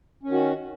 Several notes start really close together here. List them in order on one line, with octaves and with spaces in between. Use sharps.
C#4 D#3 F#4